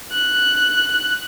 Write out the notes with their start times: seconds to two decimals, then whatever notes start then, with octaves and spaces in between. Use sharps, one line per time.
0.12 F#6